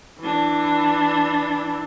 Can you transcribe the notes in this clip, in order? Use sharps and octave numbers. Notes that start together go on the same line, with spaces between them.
E3 D4